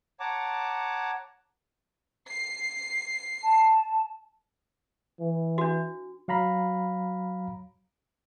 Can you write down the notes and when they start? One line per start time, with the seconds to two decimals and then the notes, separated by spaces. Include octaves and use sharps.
0.20 C#5 F#5 A5 A#5 D6
2.28 C7
3.43 A5
5.20 E3
5.58 D4 F#4
6.28 F#3 F5 A#5 B5